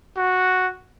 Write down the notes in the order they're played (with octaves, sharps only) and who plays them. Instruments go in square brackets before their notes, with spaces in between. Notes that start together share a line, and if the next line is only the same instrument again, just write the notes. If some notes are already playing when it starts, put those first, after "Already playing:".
[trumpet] F#4